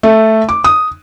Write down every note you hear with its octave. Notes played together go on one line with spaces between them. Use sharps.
A3
D6
D#6